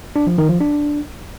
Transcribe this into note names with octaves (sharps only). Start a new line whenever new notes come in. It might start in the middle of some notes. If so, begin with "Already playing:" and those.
D4
F3
D#3
F3
D4